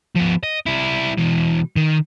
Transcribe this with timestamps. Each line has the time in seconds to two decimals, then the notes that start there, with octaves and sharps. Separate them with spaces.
0.15 F3 B3
0.43 D#5
0.67 G3 E4
1.18 B2 E3
1.76 D#3